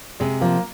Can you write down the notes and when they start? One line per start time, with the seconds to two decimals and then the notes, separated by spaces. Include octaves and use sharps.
0.20 C3 G#3
0.41 F3 A#3